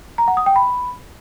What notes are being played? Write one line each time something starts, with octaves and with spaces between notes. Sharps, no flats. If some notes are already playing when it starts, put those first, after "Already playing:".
A#5
F#5
D#6
G5
B5